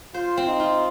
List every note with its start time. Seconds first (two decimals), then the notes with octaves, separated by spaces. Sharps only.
0.14 F4 C5
0.37 C4
0.48 D#4
0.60 F4